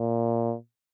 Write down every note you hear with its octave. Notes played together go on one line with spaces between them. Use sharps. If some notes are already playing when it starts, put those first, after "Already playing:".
Already playing: A#2